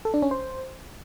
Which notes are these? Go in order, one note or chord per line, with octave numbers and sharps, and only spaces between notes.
A4
D4
C#4
C5